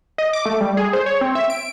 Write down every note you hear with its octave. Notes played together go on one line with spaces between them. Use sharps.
D#5
D6
A3
G3
G#4
C5
C#5
C4
E5
D7